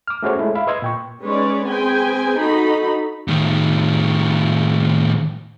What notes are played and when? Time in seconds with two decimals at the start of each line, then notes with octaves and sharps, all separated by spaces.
0.08 D6 F6
0.23 A3 C#4 F#4 G#4 C5 C#5
0.39 G#3 A3 E4 G#4
0.55 E5 F5 B5
0.67 B4 D#5 C6 D#6 E6 G#6
0.82 A#2 G5 C#6
1.22 G#3 C#4 D#4 B4 C#5 D5
1.65 C4 G#4 B4 G5 G#5
2.38 D#4 F#4 A4 B5
3.28 A2 D#3